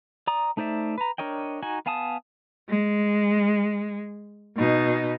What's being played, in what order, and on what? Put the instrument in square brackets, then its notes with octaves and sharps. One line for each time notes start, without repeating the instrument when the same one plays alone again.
[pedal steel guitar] D5 A#5 D#6
A3 D#4 C5 D5 E5
B4 A#5
D4 A#4 C#5 D#5 G5
D#4 F#4 G#5
B3 F5 G#5 A5 D#6
[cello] G#3
B2 D#4